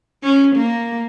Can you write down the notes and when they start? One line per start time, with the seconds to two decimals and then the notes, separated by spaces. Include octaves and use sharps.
0.23 C#4
0.56 A#3